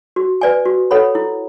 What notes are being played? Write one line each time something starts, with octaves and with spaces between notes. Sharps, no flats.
F#4
B4 D5 G#5
F#4
A4 C#5 F#5 B5
E4